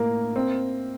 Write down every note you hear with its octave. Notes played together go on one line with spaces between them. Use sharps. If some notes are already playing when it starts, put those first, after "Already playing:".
Already playing: A2 A#3
C4